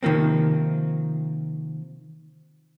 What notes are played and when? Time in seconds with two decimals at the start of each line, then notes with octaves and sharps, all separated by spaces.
0.03 C3 D#3 F3 A#3 C4